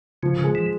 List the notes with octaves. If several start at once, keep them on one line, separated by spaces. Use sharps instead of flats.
C#3 F3
C#3
G#3
E3